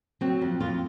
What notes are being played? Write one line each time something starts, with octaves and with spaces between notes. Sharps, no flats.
F#3 C4
F2
F2 F4